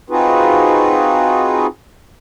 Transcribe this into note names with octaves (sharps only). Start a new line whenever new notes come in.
C4 D#4 F4 F#4 G#4 B4